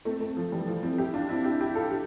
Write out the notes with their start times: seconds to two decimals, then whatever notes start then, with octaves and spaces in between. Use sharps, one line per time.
0.05 A3 C4
0.20 A3 C4
0.37 F3
0.52 E3 G3
0.67 F3
0.83 C4 E4
0.98 E4 G4
1.14 D4 F4
1.29 C4 E4
1.44 E4 G4
1.61 E4 G4
1.75 F4 A4
1.91 G4